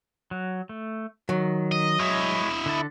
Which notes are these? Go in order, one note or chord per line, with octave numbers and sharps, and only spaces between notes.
F#3
A3
D#3 F#3
D#5
G#3 E4 C#5 D#5
D3 A4